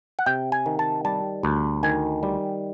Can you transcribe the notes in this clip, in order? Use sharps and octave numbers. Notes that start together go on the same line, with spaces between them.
F#5
C3 G5
G#5
D#3
A5
G3 A5
D2
D#3 G#5
G3